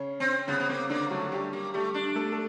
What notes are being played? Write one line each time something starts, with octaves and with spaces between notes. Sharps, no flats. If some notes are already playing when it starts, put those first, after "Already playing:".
Already playing: C#3 C#4
C4
C#3 B3 C#4
B3
A#3 C4
D3 A#3 D4
F#3 A3 F#4
G3 A3 G4
A#3
G3 A3 G4
D4
A3 A4
A4